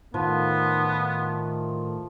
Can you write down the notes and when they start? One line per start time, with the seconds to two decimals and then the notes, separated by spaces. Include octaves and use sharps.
0.14 A2 D#3 F3 A3 B3